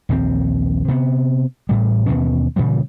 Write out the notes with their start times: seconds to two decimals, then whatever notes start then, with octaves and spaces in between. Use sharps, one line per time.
0.09 A#1 D#2 E3 C4
0.88 C3 B3
1.69 A1 A2 G3
2.06 D#2 B2 E3 C#4
2.56 A#2 C#3 E3 G3